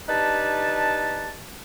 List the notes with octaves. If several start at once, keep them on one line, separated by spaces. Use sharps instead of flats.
D4 D#4 G4 B4 A5